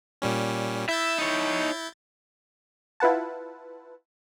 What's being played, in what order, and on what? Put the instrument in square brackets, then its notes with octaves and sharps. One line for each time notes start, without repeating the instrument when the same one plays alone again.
[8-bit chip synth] A#2 G3 C#4
[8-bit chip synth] E4 G6 A6 [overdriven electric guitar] E5
[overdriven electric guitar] D#4 C#5
[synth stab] E4 F4 B4 F#5 A5